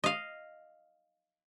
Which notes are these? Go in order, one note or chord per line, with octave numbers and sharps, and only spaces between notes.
D#5 F5